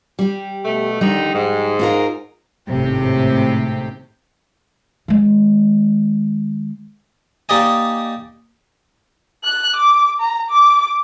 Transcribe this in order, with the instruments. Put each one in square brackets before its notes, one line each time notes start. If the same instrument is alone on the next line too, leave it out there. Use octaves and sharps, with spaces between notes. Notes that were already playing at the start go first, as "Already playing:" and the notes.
[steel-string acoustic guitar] G3 G4
[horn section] B2 A3
[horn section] D3 D#3 D#4 [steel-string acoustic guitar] F3 G3 G5
[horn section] G#2
[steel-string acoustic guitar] D#4 F4 A#4
[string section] G#1 A2 C3 G4
[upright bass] D#3 G#3
[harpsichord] A#3 D#4 G4 D5 D#5 G#5
[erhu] F#6
D6
A#5
D6